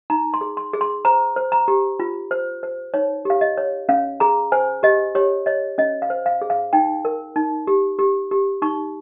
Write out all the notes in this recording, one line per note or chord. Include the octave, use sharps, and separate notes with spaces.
D#4 A#5
C6
G#4
C6
G#4
C6
C5 A#5
C5
A#5
G4
F4
C5
C5
D#4 C#5
G4 F5
D#5
C#5
C#4 F5
G#4 A#5
C5 G#5
G4 D#5
G4 C#5
C#5 D#5
C#4 D#5
F5
C5
F5
G#4
F5
D#4 G5
A#4
D#4
G4
G4
G4
D#4 C#6